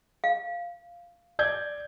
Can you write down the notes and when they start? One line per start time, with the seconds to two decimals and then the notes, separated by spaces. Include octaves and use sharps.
0.24 F5
1.39 D5 G6 G#6